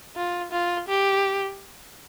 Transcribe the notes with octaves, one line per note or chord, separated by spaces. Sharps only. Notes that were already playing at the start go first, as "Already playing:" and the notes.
F4
F4
G4